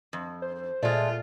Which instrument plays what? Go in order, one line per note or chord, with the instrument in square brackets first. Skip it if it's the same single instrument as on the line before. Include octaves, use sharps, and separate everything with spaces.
[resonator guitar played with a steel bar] F2
[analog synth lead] C5
[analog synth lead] A#2 [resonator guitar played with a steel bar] G#3 A3 [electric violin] F4 [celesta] D5